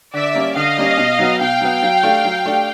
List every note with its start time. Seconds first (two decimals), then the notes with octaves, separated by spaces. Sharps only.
0.14 D3 D5 E5
0.34 G3 A#3 C#4
0.55 D3 D#5 F5
0.77 G3 A#3 C#4
0.98 B2
1.19 F#3 B3
1.40 B2 F5 G5
1.61 F#3 B3
1.83 F#3
2.03 A3 D4 G4
2.25 F#3
2.46 A3 D4 G4